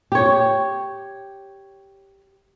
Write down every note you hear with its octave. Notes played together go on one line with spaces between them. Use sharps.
G4 C#5